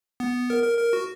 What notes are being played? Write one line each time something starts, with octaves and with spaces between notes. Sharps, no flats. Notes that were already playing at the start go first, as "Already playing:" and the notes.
B3
A#4
A#4
A#4
F#4